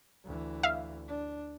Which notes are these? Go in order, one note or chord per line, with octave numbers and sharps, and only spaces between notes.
D2 E3
E5 F5
D4